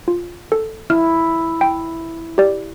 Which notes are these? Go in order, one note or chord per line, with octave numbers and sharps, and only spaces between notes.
F4
A4
E4 F6
G5
G4 D5